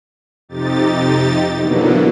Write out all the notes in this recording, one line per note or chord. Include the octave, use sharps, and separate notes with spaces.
F2 C3 D#4 G4 A6
B2 D3 E3 F#3 A#3 B3